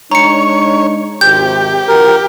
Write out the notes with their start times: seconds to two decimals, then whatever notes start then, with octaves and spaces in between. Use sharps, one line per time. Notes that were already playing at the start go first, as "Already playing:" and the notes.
0.11 G#3 D4 D#4 C#5 A#5 C#7
1.21 G#1 C3 G4 G6
1.88 A#1 F#4 A#4